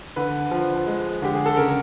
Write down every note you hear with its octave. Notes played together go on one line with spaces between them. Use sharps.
D3 B4
F3
G#3
D3 G4
G#4
A4
C#3 A#4